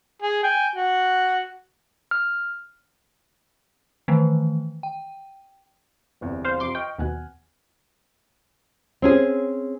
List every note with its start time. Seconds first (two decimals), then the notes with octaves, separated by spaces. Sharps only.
0.22 G#4
0.43 G5 G#5
0.76 F#4
2.11 F6
4.08 D#3 E3 A3
4.83 G5
6.21 G1 E2 C3
6.45 C5 F5
6.60 F2 C3 F4 C6 D6
6.75 D#5 G5 C#6 F6
6.99 D#2 B2 F#5 G#5 F#6
9.02 C4 C#4 G#4